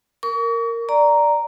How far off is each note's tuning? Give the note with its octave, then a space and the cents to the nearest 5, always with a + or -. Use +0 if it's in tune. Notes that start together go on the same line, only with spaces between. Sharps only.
A#4 -10 C#6 +40
D5 +0 A#5 +0